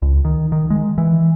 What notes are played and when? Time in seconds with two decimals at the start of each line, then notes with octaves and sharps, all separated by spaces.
0.02 C#2
0.25 D#3
0.52 D#3
0.70 G#3
0.98 E3